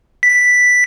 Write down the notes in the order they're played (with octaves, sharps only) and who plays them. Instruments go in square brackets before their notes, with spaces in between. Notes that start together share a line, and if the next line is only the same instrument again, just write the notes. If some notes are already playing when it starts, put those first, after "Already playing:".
[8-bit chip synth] B6